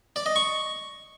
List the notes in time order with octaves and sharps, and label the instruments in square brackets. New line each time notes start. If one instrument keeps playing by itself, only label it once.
[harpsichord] D5
D#5
C#6